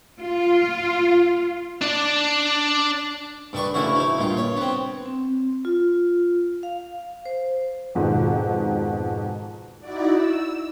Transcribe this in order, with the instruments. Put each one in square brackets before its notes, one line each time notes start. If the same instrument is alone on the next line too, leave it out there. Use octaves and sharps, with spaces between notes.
[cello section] F4
[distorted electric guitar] D4 D5
[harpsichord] G2 D4 B4 C#6
D2 C#3 C#4 E4 F#4
D#4 E4
G2 A#2 F4
C#5
B3 C4
[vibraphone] C4
F4
F5
C5
[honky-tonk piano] F2 G#2 B2 D#3
[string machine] D#4 E4 F#4 D5
E6